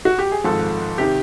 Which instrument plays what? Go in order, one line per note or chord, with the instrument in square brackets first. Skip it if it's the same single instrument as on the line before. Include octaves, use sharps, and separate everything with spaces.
[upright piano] F#4
G4
G#4
G#1 G#2 F3 A4
C3 D#3 G4